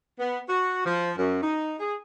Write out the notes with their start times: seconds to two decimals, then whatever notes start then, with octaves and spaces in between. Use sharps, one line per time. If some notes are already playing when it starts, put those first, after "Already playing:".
0.19 B3
0.49 F#4
0.86 F3
1.18 F#2
1.42 D#4
1.80 G#4